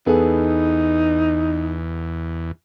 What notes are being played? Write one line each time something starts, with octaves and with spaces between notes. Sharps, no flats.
E2 B3 D#4 G#4 A4